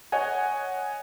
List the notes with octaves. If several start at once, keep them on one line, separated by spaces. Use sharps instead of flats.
C#5 D#5 F#5 G#5